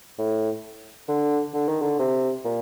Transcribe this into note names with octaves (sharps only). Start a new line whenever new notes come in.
A2
D3
D3
D#3
D3
C3
A#2